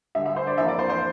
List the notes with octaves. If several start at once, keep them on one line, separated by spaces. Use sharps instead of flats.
D2 D3 G3 E5
E5
C5
D5
F2 E3 A#3 E5
D5
C5
C5